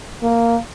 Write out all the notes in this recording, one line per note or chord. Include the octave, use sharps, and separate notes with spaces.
A#3